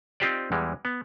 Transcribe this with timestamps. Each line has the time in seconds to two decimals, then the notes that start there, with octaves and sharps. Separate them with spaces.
0.20 C4 D#4 F4 G4 C5 D5
0.52 E2 E3 G3 G#3
0.85 B3